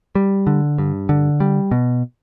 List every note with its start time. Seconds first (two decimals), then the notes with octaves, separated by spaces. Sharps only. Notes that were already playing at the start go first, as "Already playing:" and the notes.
0.15 G3
0.47 D3
0.78 G2
1.09 D3
1.40 G3
1.71 B2